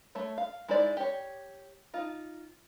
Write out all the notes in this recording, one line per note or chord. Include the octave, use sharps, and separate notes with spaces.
A3 C#5
F5
G#3 D#4 E4 C5 D5
G4 C#5
D#4 F4